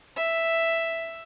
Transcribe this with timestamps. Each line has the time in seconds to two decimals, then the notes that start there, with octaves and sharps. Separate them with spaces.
0.16 E5